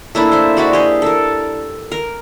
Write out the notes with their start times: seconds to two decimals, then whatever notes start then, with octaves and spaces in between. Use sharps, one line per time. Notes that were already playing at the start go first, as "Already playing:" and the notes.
0.15 A3 A#3 D4 E4
0.32 C5 E5
0.57 G#3 F#4 D5 E5
0.73 G4 G#4
1.02 A4 A#4
1.92 A#4